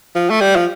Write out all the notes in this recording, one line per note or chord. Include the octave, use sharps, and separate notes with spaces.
F3
A3
G3
F3